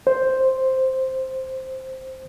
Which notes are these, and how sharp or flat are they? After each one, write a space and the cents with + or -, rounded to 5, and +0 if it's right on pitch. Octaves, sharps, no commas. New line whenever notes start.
C5 +0